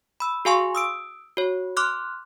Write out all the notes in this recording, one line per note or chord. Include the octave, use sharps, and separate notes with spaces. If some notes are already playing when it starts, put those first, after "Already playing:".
B5 E6
F#4 G#4 F5 G#5 C6 C#6
D#6 E6 D7
F#4 C#5
C6 D6 F6 F#6